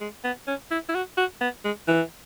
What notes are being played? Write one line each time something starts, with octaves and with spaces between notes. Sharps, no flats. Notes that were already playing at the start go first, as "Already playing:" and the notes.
G#3
B3
C#4
E4
E4
F#4
F#4
B3
G#3
E3